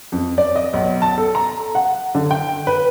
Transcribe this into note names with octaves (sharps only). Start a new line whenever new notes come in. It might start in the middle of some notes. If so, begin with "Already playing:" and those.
F2
D5
D#5
B1
A5
A4
A#5
F#5
D3
G5
B4